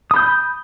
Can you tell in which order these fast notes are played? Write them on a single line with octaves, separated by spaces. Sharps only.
D#6 B5 G6